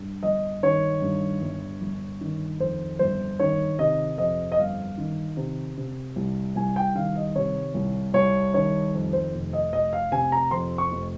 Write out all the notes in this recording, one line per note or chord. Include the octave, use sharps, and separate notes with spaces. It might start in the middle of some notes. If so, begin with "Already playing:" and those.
Already playing: G2
G1 D#5
D#3 C#5
G2
G1
G1
D#3
F2 C5
G1 C5
D#3 C#5
C3 D#5
F2 D#5
D#5
G1 F5
D#3
C3
C3
C2
C2 G#5
G5
D#3 F5
D#5
C3 C#5
C2
C2 C#5
D#3 C#5
F2
C5
F1
D#5
F1 D#5
F5
C3 G#5
A#5
F2 C6
C#6
F1